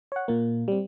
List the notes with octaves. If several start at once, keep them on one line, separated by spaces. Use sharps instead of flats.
C#5 F#5
A#2 A#3
G3 C4